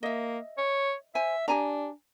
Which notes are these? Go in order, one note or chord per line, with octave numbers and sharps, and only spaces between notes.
A#3 D#5 E5
C#5
C5 E5 G#5
D4 G4 G#5 A#5